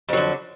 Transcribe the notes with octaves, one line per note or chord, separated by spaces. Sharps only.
F2 D3 F#3